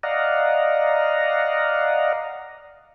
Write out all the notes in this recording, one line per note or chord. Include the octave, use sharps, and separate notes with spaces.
D5 D#5 F5 F#5 A#5